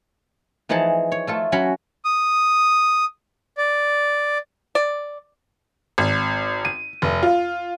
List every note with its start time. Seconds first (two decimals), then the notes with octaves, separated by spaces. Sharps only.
0.69 E3 F3 D#4 G#4 F#5 A5
1.12 C#5
1.27 A3 F4 A4
1.52 F#3 C#4 F#4 C#5 B5
2.05 D#6
3.58 D5
4.75 D5
5.98 G#1
6.65 D#7
7.02 F1
7.23 F4